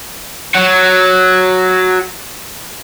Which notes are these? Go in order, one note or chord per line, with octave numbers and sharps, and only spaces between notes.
F#3 F#4